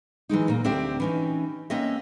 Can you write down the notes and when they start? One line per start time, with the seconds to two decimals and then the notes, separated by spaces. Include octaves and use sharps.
0.29 E3 F#3 G#3 D#4
0.48 A#2 A#3
0.64 D2 C4 D4 G4 E5
1.00 E3 C#4 D#4
1.70 A#3 C4 C#4 D#5 E5